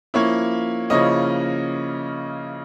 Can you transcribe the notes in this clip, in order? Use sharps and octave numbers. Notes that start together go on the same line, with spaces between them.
F3 A#3 C#4 E4 C#5
C#3 F3 A#3 C#4 E4 D#5